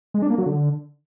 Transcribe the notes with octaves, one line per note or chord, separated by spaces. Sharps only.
G#3
D4
A#3
F#3
D3